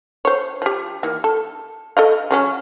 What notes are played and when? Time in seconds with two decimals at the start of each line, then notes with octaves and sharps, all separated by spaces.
0.25 C5 C#5
0.62 F3 G4
1.03 D#3 E3 A#3
1.24 A4
1.97 A4 D#5 F5
2.31 C#3 F#3 C#4